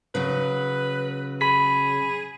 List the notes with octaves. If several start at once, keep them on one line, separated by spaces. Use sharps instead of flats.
C#3 F#3 B4
G#4 B5 B6